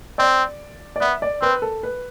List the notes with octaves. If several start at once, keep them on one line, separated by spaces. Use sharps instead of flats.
C4 D5
D5
B3 E5
D5
C4 B4
A4
B4